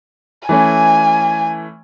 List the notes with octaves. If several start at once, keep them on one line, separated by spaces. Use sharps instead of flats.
E3 A3 C#4 G#5